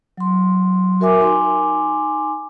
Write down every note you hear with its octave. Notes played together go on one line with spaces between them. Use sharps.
F#3 C6
F#4 A#4 E5 G#5 D6
D#4 G#5 C6 D6